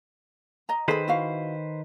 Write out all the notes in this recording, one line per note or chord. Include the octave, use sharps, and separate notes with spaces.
D#5 A#5
D#3 G#4 A4 B4 C5 B5
E4 F#4 F5